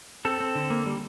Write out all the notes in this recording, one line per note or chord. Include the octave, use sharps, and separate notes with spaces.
C4 A4
C4
D3
A#3
G3